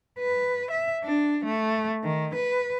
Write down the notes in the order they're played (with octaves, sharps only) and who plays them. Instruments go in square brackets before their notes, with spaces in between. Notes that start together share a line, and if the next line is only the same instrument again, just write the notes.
[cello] B4
E5
D4
A3
D#3
B4